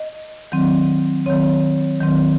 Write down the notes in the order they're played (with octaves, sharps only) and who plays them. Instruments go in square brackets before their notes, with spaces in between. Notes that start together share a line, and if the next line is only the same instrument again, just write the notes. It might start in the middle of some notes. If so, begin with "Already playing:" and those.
Already playing: [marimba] D#5
D#3 F#3 C4
D#3 F#3 C4 C#5
D#3 F#3 C4